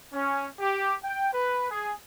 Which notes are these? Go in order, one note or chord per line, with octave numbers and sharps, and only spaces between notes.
C#4
G4
G5
B4
G#4